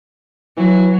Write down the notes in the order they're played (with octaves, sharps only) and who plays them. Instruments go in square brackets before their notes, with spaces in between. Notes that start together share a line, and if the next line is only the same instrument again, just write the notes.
[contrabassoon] E3 [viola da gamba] F#3